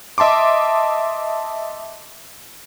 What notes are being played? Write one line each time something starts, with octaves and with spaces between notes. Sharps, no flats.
D#5 E5 A5 C6 D6